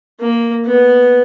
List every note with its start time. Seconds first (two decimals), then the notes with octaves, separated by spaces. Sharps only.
0.20 A#3
0.65 B3